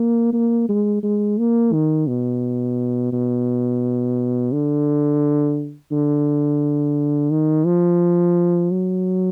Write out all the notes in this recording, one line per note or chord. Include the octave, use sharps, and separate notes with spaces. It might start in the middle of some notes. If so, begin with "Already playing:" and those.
Already playing: A#3
A#3
G#3
G#3
A#3
D#3
B2
B2
D3
D3
D#3
F3
F#3